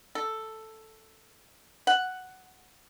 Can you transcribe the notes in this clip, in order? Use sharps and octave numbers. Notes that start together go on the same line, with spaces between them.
A4
F#5